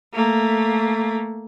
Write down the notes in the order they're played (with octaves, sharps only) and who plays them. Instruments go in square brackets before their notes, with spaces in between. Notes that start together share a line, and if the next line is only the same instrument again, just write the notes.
[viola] A3 A#3